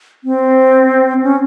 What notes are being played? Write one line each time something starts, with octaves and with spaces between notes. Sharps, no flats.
C4
C#4